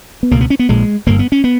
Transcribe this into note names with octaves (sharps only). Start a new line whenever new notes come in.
B3
C#2 B2 A#3
B3
C#4
B3
A#1 A#2 G#3
G1 G2 A#3
B3
C#4
B3